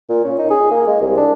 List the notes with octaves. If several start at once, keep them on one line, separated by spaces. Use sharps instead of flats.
A#2
C#4
D#4
G#4
A#3
G#3
C2
D4